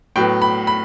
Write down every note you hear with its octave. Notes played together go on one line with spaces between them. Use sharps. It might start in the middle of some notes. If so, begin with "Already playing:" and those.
A2 F#3 B3 G5
B5
B5